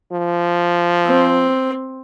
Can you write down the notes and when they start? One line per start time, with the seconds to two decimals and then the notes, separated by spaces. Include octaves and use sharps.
0.12 F3
1.06 C4